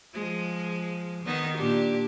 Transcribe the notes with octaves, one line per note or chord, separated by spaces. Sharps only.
F3 G#3
D#3 B3 D#4
A#2 D4 G4